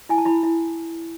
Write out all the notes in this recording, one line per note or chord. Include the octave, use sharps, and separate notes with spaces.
E4 G#5
A5
E4 B5
E4